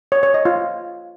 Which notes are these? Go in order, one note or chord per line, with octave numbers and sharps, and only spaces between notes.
C#5
C#5
D#5
F4